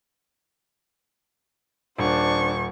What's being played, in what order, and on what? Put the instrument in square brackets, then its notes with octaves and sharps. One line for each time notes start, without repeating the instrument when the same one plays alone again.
[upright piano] D#1 [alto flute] D4 [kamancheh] C5 C#6